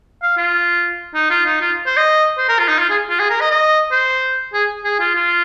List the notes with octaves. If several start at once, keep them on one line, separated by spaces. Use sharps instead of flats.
F5
F4
D#4
F4
D#4
F4
C5
D#5
C5
A#4
F4
D#4
F4
G#4
F4
G#4
A#4
D#5
D#5
C5
G#4
G#4
F4
F4